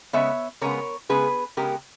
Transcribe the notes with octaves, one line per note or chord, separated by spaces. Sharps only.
C#3 G#3 B3 C#5 E5
C#3 G#3 B3 A#4 C#5
C#3 G#3 B3 G#4 B4
C#3 G#3 B3 G4 A#4